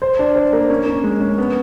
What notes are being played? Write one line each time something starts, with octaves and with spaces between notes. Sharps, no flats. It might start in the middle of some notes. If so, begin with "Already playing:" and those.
C5
D4
C5
A#3
C#4
C#4
G#3
C#4
B3